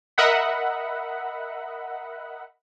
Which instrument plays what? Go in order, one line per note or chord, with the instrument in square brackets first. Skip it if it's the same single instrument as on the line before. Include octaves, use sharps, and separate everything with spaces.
[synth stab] A#4 D#5 E5 F#5 B5